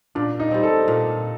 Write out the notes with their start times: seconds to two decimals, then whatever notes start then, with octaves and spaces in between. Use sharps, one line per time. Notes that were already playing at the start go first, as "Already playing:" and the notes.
0.15 A#2 D4
0.40 D#4
0.51 G3 C4
0.63 A4
0.88 A#2